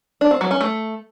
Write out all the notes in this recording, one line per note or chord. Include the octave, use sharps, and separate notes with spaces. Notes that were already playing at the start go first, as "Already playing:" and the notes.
D4
C4
F#3
C#4
A3